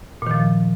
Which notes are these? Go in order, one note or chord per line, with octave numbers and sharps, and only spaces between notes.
A#2 D#3 F3